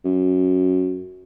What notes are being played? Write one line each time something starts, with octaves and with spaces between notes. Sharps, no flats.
F#2